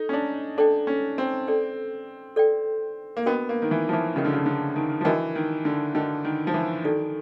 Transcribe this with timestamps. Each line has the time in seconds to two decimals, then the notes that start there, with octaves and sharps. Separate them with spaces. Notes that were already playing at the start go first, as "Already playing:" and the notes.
Already playing: D#4 A4
0.09 C#4
0.13 D4
0.58 D4 A4 D5 G5
0.87 C#4
1.18 C4
1.47 A4 D5 G5
2.36 A4 D5 G5
3.17 A#3
3.26 B3 D4 F#4 A#4 D#5 G5
3.49 A#3
3.62 D#3
3.71 E3
3.89 F3
3.93 E3
4.15 C#3 D4 F#4 A#4 D#5 G5
4.25 D3
4.33 C#3
4.46 D3
4.76 D#3
5.01 F3
5.05 E3 D4 F#4 A#4 D#5 G5
5.35 D#3
5.65 D3
5.95 D3 D4 F#4 A#4 D#5 G5
6.25 D#3
6.47 F3
6.54 E3
6.84 D#3 D4 F#4 A4 D5